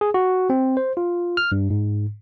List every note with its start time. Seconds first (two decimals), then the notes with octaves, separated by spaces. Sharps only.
0.01 G#4
0.14 F#4
0.50 C4
0.77 C5
0.97 F4
1.37 F6
1.52 G2
1.70 G#2